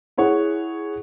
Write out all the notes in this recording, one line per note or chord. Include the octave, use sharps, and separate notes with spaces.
E4 G#4 C#5 F#5